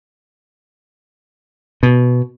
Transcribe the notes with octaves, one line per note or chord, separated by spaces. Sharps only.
B2